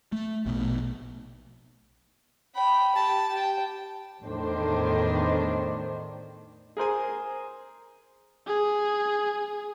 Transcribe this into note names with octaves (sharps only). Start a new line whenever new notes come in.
A3
A#1 B2
G5 B5
G4 A5
G4 G5
E2 A2 D#3 D4 C5
G#4 A#4 C5 G#5
G#4